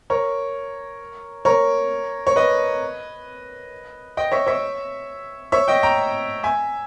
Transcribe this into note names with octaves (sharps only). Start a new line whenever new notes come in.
A#4 C#5
A#4 C#5
C#5
B4 D#5
D#5 G5
C#5 E5
C#5 E5
C#5 E5
D#5 G5
G5 A#5
E5 G#5